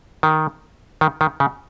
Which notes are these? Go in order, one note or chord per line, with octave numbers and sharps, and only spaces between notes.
D#3
D#3
D#3
C#3